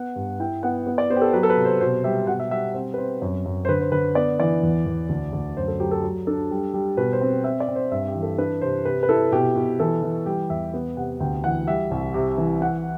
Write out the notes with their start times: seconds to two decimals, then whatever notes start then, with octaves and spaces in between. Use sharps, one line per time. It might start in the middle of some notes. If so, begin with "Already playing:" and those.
Already playing: B3 F#5
0.16 G2
0.40 E4 G5
0.63 B3 F#5
0.87 B3
0.98 D5
1.10 B3 C5
1.16 G4
1.21 A4
1.33 F#3 B4
1.43 A4
1.50 B4
1.57 C3
1.65 C5
1.81 B2 C5
2.04 G3 E5
2.27 B2 F#5
2.39 E5
2.51 G3 E5
2.74 C4 C5
2.94 B4
2.98 C4 C5
3.22 F#2
3.46 F#2
3.65 C5
3.69 D3 B4
3.81 C5
3.92 D3 B4
4.15 B3 D5
4.40 E3 D5
4.63 E2
4.86 E2
5.09 D2
5.33 D2
5.57 F#2 C5
5.68 A4
5.80 F#3 G4
5.91 A4
6.04 F#3
6.27 D4 A4
6.51 G3
6.74 G3
6.97 B2 B4
7.13 C5
7.21 C4
7.44 C4 E5
7.60 D5
7.68 C4
7.76 C5
7.91 G2 E5
8.08 G4
8.15 E3
8.23 A4
8.38 D4 B4
8.61 C3 C5
8.85 C3 B4
9.03 B4
9.09 E4 A4
9.32 B2 G4
9.55 B2
9.80 E3 A4
10.03 E3
10.26 G3 G4
10.50 E2 E5
10.74 B3
10.97 C3 F#5
11.20 D2 G5
11.44 E3 F#5
11.67 G3 E5
11.91 C2
12.14 C3
12.38 E3
12.61 E4 F#5